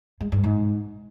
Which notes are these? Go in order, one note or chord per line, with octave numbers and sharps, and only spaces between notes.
G#3
G2
G#2